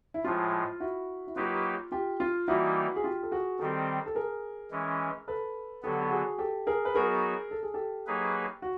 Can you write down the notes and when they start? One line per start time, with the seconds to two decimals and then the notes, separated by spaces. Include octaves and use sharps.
0.14 E4
0.24 A2 F3 G#3 F4
0.80 E4 F#4
1.27 E4
1.36 F#3 A#3 D#4 F4 G4 B4
1.92 F4 G4
2.20 F4
2.48 E3 G3 A#3 D#4 E4 F#4
2.96 G#4
3.04 F4 G4
3.23 A4
3.31 F#4 G#4
3.59 D#3 G3 C4 G4 A4
4.06 A4
4.15 G#4 A#4
4.71 E3 G#3 C#4
5.28 A4 B4
5.83 D3 F#3 B3 G4 A4
6.02 A4
6.10 F#4 G#4
6.38 G4 A4
6.67 G#4 A#4
6.85 B4
6.95 F#3 B3 D#4 F#4 G#4 A#4
7.51 A4
7.63 G#4
7.74 G4 A4
8.07 F#3 A#3 D#4 G#4 B4
8.62 F#4